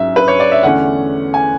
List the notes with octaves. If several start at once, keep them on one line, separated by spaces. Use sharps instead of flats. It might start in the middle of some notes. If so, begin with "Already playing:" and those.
Already playing: G#2 F#3 C#4 E5
B4
C#5
D5
E5
E2 D3 A3 C#4 F#5
G#5